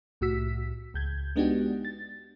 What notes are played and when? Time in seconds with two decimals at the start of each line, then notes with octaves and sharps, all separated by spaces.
0.21 C2 A2 F#4 E6 B6
0.94 C#2 G6 G#6
1.36 G#3 B3 D4 D#4 F#4 G4
1.85 A6